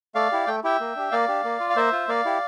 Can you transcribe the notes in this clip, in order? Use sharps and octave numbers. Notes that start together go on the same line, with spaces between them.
A3 D5 F5
E4 G4
A3 G5
E4 G4 E5 G5
A#3
D4 G4
A#3 D5 F5
D4 G4
A#3
F4
F5
A#3 C5 E5
F4
A#3 D5 F5
E4 G4